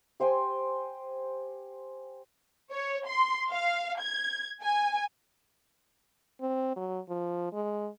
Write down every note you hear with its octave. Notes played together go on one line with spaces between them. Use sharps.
G4 C5 G5 G#5
C#5
C6
F5
G#6
G#5
C4
F#3
F3
G#3